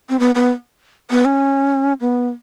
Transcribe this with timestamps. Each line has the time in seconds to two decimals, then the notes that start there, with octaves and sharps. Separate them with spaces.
0.09 C4
0.19 B3
0.35 B3
1.11 B3
1.25 C#4
2.01 B3